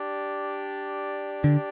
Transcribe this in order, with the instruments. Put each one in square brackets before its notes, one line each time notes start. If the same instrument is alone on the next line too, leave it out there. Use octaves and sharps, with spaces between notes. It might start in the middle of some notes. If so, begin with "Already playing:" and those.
Already playing: [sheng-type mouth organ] D4 G4 D5
[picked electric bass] D3